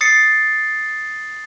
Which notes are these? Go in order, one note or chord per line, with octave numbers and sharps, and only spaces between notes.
D#6 A6 C7 C#7